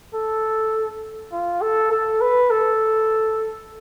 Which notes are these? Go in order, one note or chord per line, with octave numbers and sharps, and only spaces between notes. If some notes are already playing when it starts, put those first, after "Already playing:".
A4
F4
A4
A4
B4
A4